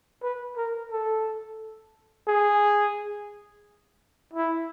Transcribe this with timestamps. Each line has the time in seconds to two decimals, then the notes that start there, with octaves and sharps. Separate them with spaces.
0.23 B4
0.57 A#4
0.91 A4
2.28 G#4
4.33 E4